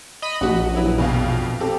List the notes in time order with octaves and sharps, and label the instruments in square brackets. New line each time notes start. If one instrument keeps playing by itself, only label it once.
[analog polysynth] D#5 B5
[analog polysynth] A#1 [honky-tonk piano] F#4 F#5
[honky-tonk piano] F#3 E4 B4
F2 B2 F5
C4 G4 A4